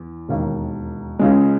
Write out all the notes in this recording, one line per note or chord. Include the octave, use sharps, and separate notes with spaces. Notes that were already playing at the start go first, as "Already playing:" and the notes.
Already playing: E2
E1 D#2 D#3
C#2 C#3 G#3